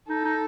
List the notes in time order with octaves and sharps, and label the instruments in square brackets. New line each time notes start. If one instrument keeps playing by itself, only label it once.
[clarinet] D#4 [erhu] A4
[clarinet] D#4